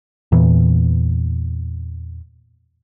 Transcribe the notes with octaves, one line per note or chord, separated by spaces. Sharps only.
E2 A#2 E3